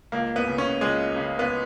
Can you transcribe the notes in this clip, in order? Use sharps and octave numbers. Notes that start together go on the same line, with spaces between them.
C#2 A#3
B3
C#3
C#4
C#2 G#3
C#3
B3